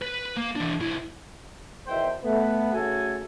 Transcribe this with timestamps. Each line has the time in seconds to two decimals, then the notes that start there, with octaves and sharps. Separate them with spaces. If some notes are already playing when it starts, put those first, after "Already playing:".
0.02 B4
0.37 A#3
0.56 E3 D4
0.80 C#2 E4
1.87 E2 B2 D#3 C5 E5 G5
2.24 A3 B3 B4
2.74 C#3 A3 F#4 A4 G#5